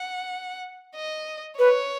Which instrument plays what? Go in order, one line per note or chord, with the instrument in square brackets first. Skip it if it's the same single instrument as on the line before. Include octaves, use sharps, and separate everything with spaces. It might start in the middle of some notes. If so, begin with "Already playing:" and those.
Already playing: [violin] F#5
D#5
[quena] B4 [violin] C#5